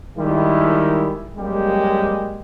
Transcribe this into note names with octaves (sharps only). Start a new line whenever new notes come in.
D#3 G3 G#3 E4
F#2 G3 G#3 A#3 G4